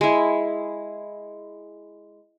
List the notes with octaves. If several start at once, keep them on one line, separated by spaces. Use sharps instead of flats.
G#3 E4